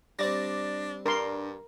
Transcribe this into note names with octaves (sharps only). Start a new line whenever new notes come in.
G3 C4 D4 D5 A6 A#6
G2 D4 A#4 C6